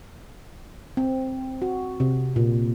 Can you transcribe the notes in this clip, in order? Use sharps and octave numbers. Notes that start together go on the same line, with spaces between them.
C4
F#4
C3
A#2